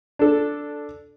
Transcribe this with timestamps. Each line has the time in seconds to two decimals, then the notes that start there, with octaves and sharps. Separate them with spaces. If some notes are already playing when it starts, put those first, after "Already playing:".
0.19 D4 A4